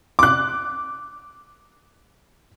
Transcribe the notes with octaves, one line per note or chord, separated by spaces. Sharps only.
D6 F#6